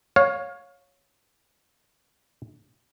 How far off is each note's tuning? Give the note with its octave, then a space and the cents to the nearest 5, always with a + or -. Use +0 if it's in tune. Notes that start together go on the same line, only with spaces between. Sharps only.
C#5 +0 F5 +25